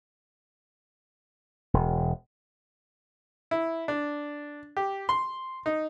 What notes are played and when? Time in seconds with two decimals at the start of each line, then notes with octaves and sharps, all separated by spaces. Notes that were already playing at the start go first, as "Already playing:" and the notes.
1.74 E1
3.51 E4
3.88 D4
4.77 G4
5.09 C6
5.66 D#4